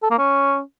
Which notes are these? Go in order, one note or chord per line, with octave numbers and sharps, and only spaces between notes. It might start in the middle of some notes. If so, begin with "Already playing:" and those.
A4
A#3
C#4